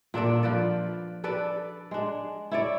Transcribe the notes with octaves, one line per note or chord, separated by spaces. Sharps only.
A#2 D4 A4 D5
F3 B4 D5
D4 A4 B4 D5
G#3 D4
E4 C#5 D5